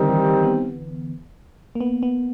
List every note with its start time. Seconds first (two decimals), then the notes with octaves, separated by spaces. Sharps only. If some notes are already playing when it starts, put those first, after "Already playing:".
Already playing: D3 D#3 G3 C4 D#4 G4
0.09 E3
0.43 B3
1.75 A#3
1.81 B3
2.03 B3